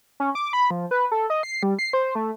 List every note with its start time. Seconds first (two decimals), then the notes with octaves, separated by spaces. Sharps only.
0.20 C#4
0.35 D6
0.53 B5
0.71 F3
0.91 B4
1.12 A4
1.30 D#5
1.43 C7
1.63 G3
1.79 C7
1.93 C5
2.15 A3